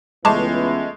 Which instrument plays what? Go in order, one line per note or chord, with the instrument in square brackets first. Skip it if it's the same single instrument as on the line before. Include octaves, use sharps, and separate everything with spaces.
[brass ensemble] C#2 E3 B3 [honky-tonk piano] G#3 A3 [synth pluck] A5 C#6 D6